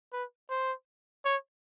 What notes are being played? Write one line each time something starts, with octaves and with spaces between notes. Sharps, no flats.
B4
C5
C#5